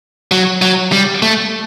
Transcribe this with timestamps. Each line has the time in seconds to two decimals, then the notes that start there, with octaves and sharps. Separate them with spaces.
0.32 F#3
0.62 F#3
0.92 G3
1.22 A3